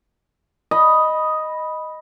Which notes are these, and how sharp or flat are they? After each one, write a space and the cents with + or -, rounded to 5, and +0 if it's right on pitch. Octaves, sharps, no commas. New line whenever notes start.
D#5 +0 B5 -5